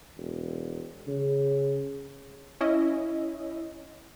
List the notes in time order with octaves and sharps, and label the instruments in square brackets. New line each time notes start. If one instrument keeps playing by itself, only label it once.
[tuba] E1
C#3
[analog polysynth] C#4 E4 D#5